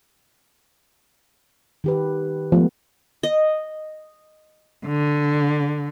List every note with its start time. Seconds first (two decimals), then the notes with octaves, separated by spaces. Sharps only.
1.84 D#3 G4 B4
2.52 F3 G#3 A3 B3
3.23 D#5
4.85 D3